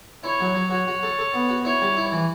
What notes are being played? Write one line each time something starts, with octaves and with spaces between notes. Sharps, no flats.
E4 C#5
F#3
F#3
F#4 C#5
F#4
A4
A4
B3
F#4
E4 C#5
G3
E4
E3